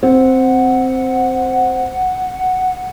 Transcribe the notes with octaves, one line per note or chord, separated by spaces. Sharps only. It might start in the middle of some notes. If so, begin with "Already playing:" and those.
C4 F#5